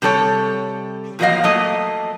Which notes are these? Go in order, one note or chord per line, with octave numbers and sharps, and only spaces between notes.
C3 G3 A4 C#5
E2 A#2 F3 F#3 D#5 F5
F#3 A3 A#3 D#5